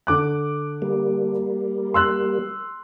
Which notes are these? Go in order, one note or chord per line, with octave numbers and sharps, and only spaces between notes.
D3 D6 F#6
G3 A#3
C6 E6 F#6